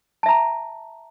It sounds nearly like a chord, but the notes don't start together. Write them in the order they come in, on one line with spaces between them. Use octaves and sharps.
A5 E5 A#5